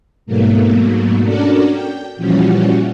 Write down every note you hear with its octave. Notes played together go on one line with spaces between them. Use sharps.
G#2 B2 F#3 A3 A#3
C#4 D4 F#4 A4 A#4 D5
G5
A#2 E3 F3 G3 C#4 F#4